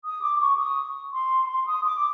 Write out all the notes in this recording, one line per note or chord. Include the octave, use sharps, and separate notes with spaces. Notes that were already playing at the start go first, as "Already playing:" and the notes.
D#6
D6
C#6
D#6
C6
C6
D#6
D6